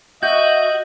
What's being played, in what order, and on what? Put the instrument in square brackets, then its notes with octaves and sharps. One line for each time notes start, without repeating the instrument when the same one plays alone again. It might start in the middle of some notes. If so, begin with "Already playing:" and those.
[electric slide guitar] F#4 [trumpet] D#5 [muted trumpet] E5 [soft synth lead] G6